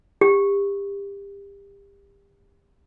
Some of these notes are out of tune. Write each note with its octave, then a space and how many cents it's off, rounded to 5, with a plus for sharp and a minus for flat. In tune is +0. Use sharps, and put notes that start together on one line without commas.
G4 +30